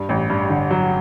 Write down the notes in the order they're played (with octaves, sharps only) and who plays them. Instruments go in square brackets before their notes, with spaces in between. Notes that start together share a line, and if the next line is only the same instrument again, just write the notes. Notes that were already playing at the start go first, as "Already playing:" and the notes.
Already playing: [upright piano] G2
A1
G2
D3
F#3